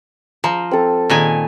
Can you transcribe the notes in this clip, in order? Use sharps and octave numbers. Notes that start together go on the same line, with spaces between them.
F3 A#5
C4 A4
A#2 D#3 G#5